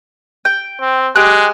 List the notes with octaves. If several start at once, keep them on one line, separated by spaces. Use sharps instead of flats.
G5
C4
G#3 G4 F#6